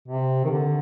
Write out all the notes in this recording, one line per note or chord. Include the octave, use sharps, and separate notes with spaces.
C3
D#3
D3